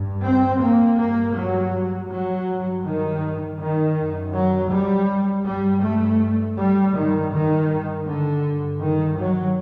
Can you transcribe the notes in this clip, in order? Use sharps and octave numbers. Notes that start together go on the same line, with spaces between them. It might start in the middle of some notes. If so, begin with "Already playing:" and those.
Already playing: G2
C4
A#3
G2 A#3
F#3
F#3
G2
D#3
D#3
F#2
F#3
G3
G2 G3
A3
G3
G2 D#3
D#3
D3
G2
D#3
F#3